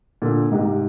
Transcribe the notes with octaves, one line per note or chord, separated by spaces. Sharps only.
A#2 D3
G#2 C3